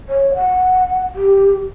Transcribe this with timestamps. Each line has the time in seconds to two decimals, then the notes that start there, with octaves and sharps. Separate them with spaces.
0.09 C#5
0.35 F#5
1.15 G4